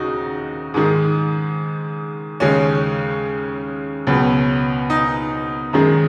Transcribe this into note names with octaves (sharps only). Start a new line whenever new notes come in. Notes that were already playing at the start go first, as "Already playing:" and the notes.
Already playing: D#2 C#3 D#4 F#4
G#2 D#3 G#3
D#2 C#3 G#3 C#4
C#2 B2 F#3
D#4
F#2 D#3 G#3